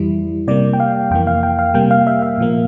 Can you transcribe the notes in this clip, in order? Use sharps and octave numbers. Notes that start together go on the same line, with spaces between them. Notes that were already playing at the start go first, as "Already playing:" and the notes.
Already playing: F2 E3 G3 E4
C3 G3 A#3 D5
G5
F5
F2 E3 A#3 G5
F5
G5
F5
C3 G3 A#3 G5
F5
E5
F5
A#2 F3 A#3